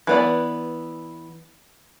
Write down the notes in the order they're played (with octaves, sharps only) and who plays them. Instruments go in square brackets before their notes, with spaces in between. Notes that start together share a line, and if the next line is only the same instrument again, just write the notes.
[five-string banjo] E3 B3 D5